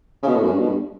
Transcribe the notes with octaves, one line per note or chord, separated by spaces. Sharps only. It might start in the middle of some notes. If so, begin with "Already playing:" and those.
C#3
B2
A2
F#2
G2
B2
G2